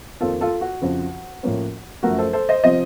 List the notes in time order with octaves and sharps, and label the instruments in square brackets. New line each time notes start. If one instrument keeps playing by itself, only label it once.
[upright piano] F2 D#3 A#3 F4 A4
F4 A4
F#4
F2 C#3 F3
A2 F3 A#3 C#4
F#2 F3 A3 F#4 A#4
A4 C5
A4 C5
C5 D#5
C3 F3 C4 C5 D#5